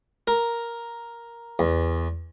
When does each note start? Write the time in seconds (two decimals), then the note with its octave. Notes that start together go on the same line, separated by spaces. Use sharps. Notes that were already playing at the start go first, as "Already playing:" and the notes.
0.28 A#4
1.59 E2